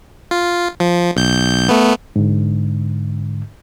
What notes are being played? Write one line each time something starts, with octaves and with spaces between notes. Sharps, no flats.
F4
F3
B1 G6
A3 B3
G#2 D3